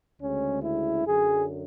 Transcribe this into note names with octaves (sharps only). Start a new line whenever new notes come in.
D2 C#3 G#3 C#4
E4
F#2 D3 F#3 G#4